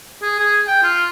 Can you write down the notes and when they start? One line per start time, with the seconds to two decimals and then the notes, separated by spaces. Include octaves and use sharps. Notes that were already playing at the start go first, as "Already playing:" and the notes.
0.22 G#4
0.39 G#4
0.67 G5
0.83 F4